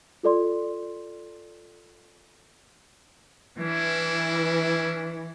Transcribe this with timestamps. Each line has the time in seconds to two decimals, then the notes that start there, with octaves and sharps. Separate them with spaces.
0.23 F4 A4 D5 C6
3.58 E3 C#4 D4 E4